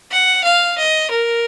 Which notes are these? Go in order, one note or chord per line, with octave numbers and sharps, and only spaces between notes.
F#5
F5
D#5
A#4